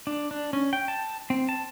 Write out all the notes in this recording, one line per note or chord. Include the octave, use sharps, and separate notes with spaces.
D4
D4
C#4
G5
A5
C4
A5